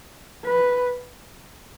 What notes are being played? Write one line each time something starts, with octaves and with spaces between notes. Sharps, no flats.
B4